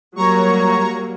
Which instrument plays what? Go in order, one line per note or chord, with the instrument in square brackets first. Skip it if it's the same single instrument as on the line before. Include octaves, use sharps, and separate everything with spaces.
[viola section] F#3 G3 A#3 [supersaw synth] C#5 A#5 C#6